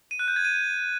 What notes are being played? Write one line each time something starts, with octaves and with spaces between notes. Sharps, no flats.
D#7
F#6
G6
G#6
D#7